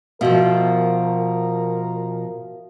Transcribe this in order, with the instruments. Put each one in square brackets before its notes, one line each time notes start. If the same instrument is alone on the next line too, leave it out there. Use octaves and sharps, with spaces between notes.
[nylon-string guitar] B2 F3 [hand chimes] F#4 E5 F5 [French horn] A#4